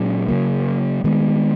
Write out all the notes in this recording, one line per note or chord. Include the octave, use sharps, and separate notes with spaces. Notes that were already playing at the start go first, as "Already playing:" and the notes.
Already playing: A#2 F#3 C#4
C#3 F#3 A#3
D#3 G#3 B3